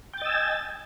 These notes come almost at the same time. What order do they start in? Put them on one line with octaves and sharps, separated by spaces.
G5 A6 D#5 E6 G#5